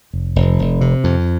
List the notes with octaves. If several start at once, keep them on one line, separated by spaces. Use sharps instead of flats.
F1
F1
F1
C3
F2